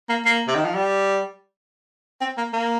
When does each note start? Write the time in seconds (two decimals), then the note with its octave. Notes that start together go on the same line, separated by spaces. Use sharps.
0.09 A#3
0.25 A#3
0.48 C3
0.55 D#3
0.65 F3
0.75 G3
2.21 C4
2.37 A#3
2.53 A#3